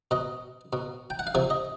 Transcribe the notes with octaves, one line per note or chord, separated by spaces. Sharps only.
B2 D#5
B2
G5
F#5
F5
C3 F3 E5
D#5